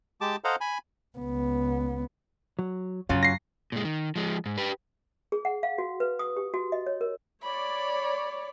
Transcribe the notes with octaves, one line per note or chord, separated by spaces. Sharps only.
G#3 G4 A5 D6
A4 C5 D#5 F5 F#5 A#5
G#5 B5
C#2 B3
F#3
F#2 C#3 F#3 C#4 F4
A#6 C7
A#2 G#3
D#3
F3 G#3
G#2
G4 B4
G#4
F#5
F5
F#4
B4
D#6
G4
F#4
D#5
C#5
A#4
C#5 D5 B5